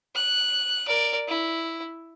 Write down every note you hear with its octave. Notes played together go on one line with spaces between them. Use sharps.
F#6
A#4 D5
E4